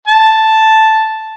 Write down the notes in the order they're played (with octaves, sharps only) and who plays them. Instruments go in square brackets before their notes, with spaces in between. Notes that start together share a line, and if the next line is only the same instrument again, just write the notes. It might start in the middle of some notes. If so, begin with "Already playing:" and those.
[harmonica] A5